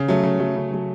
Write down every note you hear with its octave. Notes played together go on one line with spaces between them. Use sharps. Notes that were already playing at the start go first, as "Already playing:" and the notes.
Already playing: C#3
F#3 A3
C#3
F#3 A3
C#3
F#3 A3